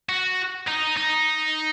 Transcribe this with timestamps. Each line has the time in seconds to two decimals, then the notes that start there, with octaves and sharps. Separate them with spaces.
0.09 F#4
0.68 D#4
0.97 D#4